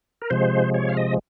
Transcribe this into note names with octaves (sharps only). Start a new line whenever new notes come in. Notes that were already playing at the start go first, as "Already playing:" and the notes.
A#4
C3 F3 G#3 C5
C#5
F5
D#5